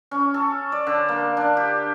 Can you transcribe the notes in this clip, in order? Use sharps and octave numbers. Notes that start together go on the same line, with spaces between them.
C#4
A4
D5
D3
A#3
D4
G4